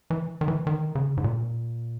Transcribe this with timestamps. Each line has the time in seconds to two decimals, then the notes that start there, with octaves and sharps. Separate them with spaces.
0.10 E3
0.41 D#3
0.48 E3
0.67 D#3
0.95 C#3
1.17 G#2
1.24 A#2